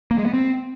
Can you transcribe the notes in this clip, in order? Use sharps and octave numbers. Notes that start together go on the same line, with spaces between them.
A#3
G#3
B3
C4